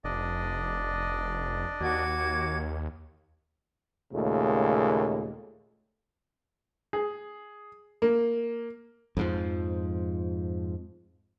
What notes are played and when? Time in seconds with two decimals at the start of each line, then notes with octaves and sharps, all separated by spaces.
0.04 F1 D4 D5 D#5
1.80 D#2 F#4 D6 G#6
4.13 D#2 A#2 C#3 G#3 A3
6.93 G#4
8.02 A#3
9.17 F2 G#2 F3